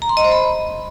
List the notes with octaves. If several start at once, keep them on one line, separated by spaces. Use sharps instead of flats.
A#5
C6
D#5
C5
B5